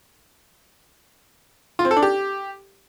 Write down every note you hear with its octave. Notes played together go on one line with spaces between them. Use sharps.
F4
C4
A4
D4
G4